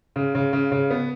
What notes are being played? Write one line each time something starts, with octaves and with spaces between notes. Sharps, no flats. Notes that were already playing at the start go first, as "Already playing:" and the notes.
C#3
C#3
C#3
C#3
B3